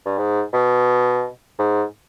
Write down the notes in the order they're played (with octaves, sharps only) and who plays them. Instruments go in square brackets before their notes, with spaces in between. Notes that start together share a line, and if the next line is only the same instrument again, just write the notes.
[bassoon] G2
G#2
B2
G#2